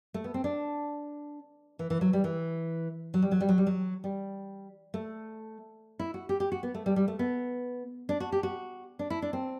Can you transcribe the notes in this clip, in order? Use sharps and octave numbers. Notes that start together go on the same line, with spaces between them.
A3
B3
C4
D4
E3
E3
F#3
G3
E3
F#3
G3
F#3
G3
F#3
G3
F#3
G3
A3
E4
F#4
G4
G4
F#4
B3
A3
G3
G3
A3
B3
D4
F#4
G4
F#4
D4
E4
D4
C4